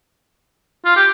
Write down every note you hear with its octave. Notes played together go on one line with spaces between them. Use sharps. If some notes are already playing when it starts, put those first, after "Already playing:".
F4
G4